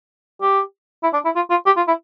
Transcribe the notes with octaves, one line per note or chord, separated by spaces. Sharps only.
G4
E4
D4
E4
F4
F4
G4
F4
E4